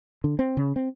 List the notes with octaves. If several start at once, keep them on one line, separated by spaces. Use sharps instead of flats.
D3
C4
C#3
C4